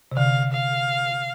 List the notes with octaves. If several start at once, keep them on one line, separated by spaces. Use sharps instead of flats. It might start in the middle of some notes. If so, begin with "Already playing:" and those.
C3
D3 F5
F5